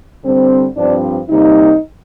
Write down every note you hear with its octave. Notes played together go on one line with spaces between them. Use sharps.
D3 G3 C4
G2 F3 C4 D4
C3 G3 A#3 D#4